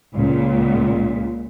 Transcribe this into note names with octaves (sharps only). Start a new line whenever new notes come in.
C#2 A#2